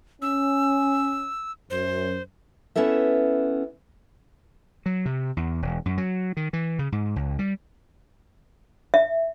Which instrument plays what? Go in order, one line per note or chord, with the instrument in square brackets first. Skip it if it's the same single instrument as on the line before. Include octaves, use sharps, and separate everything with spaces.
[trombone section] C#4 [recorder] E6
[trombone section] F#2 [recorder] C5
[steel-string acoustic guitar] B3 C#4 E4 A4 E5
[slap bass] F#3
C3
E2
E1
F#2
F#3
D#3
E3
C#3
G#2
C#2
G3
[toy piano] E5